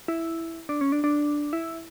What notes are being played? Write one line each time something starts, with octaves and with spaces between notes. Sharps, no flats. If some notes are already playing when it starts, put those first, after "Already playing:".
E4
D4
C#4
D4
D4
E4